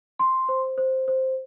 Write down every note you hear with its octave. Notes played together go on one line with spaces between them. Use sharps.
C6
C5
C5
C5